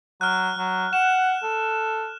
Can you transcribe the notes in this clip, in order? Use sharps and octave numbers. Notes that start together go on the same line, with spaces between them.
F#3 F6 F#6
F#3
F#5 E7
A4